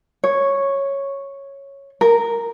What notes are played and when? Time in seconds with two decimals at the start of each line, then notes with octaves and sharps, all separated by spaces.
0.24 C#5
2.01 A#4